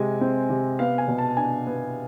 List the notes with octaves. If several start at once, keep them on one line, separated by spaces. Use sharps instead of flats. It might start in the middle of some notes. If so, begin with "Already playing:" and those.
Already playing: C3 G#3 G#5
C4
C3
B3 F5
G#5
B2
A5
D4 G#5
B3